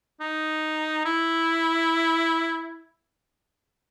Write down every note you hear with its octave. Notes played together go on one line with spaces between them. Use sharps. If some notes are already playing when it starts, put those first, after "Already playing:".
D#4
E4